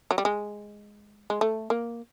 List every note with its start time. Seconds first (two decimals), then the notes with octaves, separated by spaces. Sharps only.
0.11 F#3
0.18 G3
0.25 G#3
1.30 G#3
1.41 A3
1.70 A#3